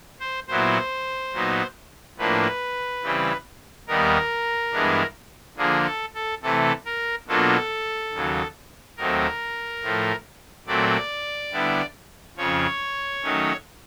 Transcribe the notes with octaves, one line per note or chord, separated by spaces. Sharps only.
C5
A#2 F#3 B3 E4 C5
A#2 F#3 B3 D#4
A2 F3 A#3 D4 B4
C#3 E3 G3 C4
D#2 D#3 G3 B3 A#4
G2 E3 G#3 B3 D4
D3 F3 A#3 G#4
A4
A4
C3 E3 A3 A4
A#4
B2 F#3 A#3 D4 F4 A4
D#2 C#3 F#3
D#2 D#3 F#3 A3 C4 A#4
A2 F3 A3
A#2 F#3 A3 C4 D5
D3 G3 B3 E4
F2 C#3 F3 C#5
D#3 F#3 A3 C#4